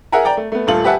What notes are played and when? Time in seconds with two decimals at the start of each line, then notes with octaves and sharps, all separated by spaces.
0.12 G#4 A#4 E5 F#5 G#5 A#5
0.25 D5 G5 A#5
0.37 A3
0.52 A3 B3
0.67 D#1 A3 F4 A4 F#7
0.84 G4 B4 E5 F#5 G#5 A5